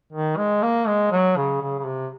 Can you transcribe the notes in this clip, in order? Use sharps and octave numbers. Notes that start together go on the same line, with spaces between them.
D#3
G#3
A#3
G#3
F#3
C#3
C#3
C#3
C3